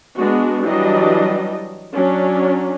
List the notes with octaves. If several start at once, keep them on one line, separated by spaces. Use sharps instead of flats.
G#3 B3 D4 F#4
E3 F#3 G3 D4 D#5
F#3 C#4 D4